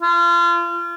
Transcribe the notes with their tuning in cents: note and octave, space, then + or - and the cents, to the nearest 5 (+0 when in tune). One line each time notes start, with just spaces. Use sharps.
F4 -30